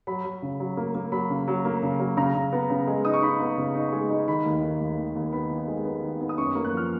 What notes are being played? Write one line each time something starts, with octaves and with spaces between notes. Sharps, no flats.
F#3 B5
F#3
C#3
F#3
A#3
A#3
F#3 B5
C#3
F#3
A#3
C#3
F#3
C#3 A#5
C#3
B3
C#3
G#3
D#4 D#6
C#6
D#4 B5
B3
C#3
D#4
G#3
D#4
D#3 B5
D#2
D#3
D#2
D#2
D#2
B3 B5
D#3
G#3
B3
D#3
B3
D#6
F#2 C#6
A#3
F#6
F3 F6